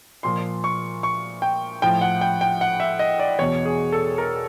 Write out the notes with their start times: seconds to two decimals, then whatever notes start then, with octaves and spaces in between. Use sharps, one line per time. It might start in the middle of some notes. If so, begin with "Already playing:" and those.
0.23 A#2 F3 C6
0.64 C#6
1.03 C#6
1.42 G5
1.82 A2 F3 G5
2.01 F#5
2.21 G5
2.41 G5
2.61 F#5
2.80 E5
2.99 D#5
3.19 D5
3.39 E2 B2 C#5
3.66 G#4
3.92 A4
4.18 A#4